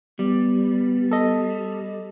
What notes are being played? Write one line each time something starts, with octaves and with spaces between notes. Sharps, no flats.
G3 B3
A4 D#5